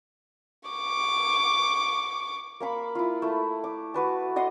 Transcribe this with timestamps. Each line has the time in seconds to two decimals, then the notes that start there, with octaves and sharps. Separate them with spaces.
0.69 C#6 D6
2.60 A#3 F5 B5 C#6
2.95 E4 F4
3.22 A3 E4
3.64 D6
3.94 F#4 B4 A5
4.36 F#4 D#5 F#5 C6